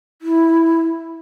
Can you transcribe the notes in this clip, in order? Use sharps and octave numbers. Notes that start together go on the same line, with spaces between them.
E4